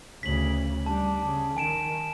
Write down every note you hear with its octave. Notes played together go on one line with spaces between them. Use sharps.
D2 C#3 B6 F#7
G3 D4 A5
C#3
D#3 G#5 D7 E7